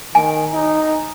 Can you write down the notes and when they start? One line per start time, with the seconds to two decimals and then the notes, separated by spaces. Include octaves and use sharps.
0.15 D#3 G#5
0.54 D#4